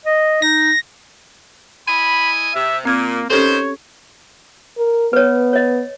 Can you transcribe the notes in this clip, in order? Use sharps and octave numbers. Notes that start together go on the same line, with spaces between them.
D#5
D#4 A#6
E4 D#5 G#5 B5
C3 E5
A#2 A#3 C4 G#6
D#3 C#4 G4 A4 C5 C#5
A#4
B3 B4 C#5
C#5 D#5